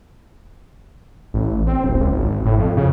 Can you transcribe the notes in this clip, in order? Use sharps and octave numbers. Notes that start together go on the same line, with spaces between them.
A1
C4
D1
C#2
G#1
A2
F2
C#3